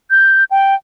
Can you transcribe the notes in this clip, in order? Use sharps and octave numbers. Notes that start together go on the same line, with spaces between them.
G6
G5